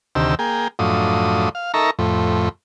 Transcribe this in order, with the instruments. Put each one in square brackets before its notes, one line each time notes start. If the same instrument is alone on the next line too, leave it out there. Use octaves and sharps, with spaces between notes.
[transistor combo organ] D2 C3 D#3 G4 E6
A#3 G#4 G5
F#2 A2 F3 D4 D#6
F5
D#4 A4 A#4 E5 A#5 C#6
F2 A2